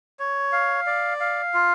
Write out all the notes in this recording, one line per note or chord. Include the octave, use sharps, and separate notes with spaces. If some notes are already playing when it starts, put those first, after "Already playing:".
C#5
F5
D5
F5
F4